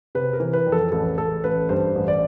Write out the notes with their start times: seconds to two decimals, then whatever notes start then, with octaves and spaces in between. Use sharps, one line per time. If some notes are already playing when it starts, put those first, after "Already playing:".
0.15 C3 B4
0.33 A#4
0.40 E3
0.53 B4
0.67 F2
0.72 A4
0.92 A1 A4
1.18 A1 A4
1.44 A1 B4
1.69 G2 C5
1.95 A1
2.08 D5